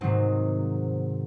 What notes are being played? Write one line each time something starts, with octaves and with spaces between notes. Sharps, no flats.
G#2 C3 D#3 F#3 C4